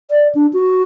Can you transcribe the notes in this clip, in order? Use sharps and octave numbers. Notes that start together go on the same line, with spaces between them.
D5
D4
F#4